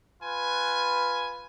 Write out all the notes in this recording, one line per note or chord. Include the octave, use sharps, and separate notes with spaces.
F4 B4 G#5